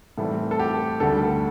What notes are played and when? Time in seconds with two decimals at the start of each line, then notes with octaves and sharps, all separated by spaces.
0.18 A2 E3 G3 C4 A4
0.51 A4
0.59 G4
1.00 D2 D3 G3 A4